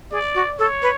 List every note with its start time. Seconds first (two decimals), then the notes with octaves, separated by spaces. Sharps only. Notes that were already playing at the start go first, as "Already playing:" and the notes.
0.11 G#4 D5
0.35 F#4
0.58 A4 C#5
0.82 B4